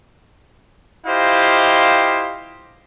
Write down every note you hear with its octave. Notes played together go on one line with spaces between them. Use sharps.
E4 F4 G4 C5 D#5 F5